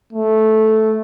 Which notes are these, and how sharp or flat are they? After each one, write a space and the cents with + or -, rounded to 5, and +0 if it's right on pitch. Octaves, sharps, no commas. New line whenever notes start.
A3 -10